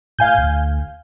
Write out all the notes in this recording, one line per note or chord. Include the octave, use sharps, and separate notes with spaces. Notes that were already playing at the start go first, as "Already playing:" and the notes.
A2 F5 G#5 G6
D2